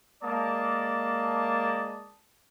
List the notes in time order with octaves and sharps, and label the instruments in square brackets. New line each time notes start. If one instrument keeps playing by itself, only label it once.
[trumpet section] G#3 A#3 D5 A5 D#6